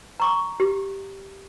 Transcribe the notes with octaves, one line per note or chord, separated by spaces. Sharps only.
A#5 C#6 D6
G4